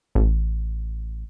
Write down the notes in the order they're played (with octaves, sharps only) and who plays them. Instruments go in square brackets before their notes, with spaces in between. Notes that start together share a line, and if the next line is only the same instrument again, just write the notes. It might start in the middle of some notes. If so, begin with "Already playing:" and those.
[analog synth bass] A1